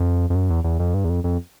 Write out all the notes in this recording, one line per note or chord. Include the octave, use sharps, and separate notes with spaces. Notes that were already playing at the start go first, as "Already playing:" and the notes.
Already playing: F2
F2
F#2
E2
E2
F2
G2
E2
F2
F2